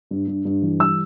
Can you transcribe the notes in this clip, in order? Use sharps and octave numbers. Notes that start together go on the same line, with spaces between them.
G2
G2
G2
E3
G3 E6